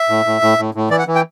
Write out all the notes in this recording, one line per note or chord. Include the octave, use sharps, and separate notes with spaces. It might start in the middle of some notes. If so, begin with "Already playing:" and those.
Already playing: E5
A2
A2
A2
A2
A2
E3 D5
F#5
E3
G5